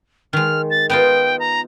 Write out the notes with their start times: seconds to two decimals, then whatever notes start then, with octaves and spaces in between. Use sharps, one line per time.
0.33 D#3 G#3 F6
0.70 A6
0.90 B3 D#4 F4 G5
1.39 A#5